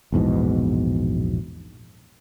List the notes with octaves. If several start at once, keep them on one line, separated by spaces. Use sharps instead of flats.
A#1 E2 G#2 B2